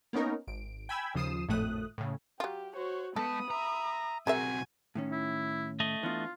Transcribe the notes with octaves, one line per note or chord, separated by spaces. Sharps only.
A#3 B3 C#4 D#4 A#4
G#1 D7
G5 G#5 B5 E6 G#6
D#2 C#3 F3 D#6 C7 E7
G#1 F2 A2 A3 D#6 F#6
A2 C#3
F#3 F4 G4
F#4 C5 C#5
G#3 B3 A4 A5 B5 D#6
E5 A#5
B1 C4 F#4 G#4 A#4 E5 G#5
A2 D#3 C#4
E4
A3 D#5
E3 B3 D4 F4